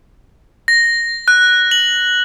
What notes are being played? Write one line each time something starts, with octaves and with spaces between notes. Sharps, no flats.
A#6
F#6
F#7